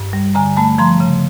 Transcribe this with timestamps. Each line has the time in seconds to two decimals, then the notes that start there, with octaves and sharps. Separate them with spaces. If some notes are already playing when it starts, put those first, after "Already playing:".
Already playing: G2
0.13 G3
0.35 D3 G#5 A#5
0.57 A3 A5 B5
0.78 F3 A#5 C6
1.00 C#3